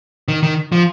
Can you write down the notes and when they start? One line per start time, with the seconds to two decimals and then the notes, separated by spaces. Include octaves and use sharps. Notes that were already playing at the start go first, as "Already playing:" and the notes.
0.28 D#3
0.43 D#3
0.72 F3